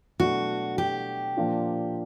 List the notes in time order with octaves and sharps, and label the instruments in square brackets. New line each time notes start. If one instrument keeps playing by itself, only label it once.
[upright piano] B2 F#3 A3 D4 [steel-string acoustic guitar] F#4
[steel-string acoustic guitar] G4
[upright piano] A#2 F3 A#3 D4 F4